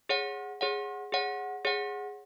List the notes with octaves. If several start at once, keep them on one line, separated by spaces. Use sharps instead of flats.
G#4 C#5 F#5
G#4 C#5 F#5
G#4 C#5 F#5
G#4 C#5 F#5